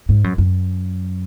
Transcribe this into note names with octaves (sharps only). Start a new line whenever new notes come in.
G#2
F#2
F#2